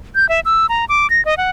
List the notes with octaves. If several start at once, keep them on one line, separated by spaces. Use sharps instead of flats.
G6
E5
E6
A#5
D6
A#6
D#5
F#5